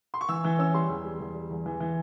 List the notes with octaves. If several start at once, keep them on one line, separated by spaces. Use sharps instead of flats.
C6
C#6
E3 E6
E3 E6
C#4 E6
G3 C6
E2
G3
E2
G3
E2
E3
E3